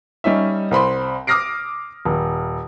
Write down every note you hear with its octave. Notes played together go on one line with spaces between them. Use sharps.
G3 C#4 D#4 E5
C2 C4 B5 C6
D6 D#6 F6 A#6 C7 D7
D#1